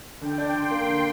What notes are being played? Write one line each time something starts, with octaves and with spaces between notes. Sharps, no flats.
D3 G5
D4
D3 C6
A#3
D3